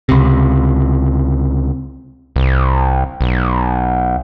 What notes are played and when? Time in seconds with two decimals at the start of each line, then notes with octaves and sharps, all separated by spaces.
0.09 C#2 C3
2.36 C2
3.21 B1